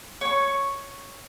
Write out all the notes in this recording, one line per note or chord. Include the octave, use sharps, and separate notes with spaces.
C#5 C#6